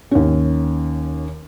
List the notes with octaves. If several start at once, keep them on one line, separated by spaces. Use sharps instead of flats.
D#2 C#4